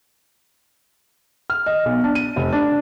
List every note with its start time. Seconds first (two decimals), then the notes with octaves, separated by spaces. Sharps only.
1.50 F6
1.66 D#5
1.85 B1
2.04 D4
2.15 D#7
2.36 F1
2.53 D4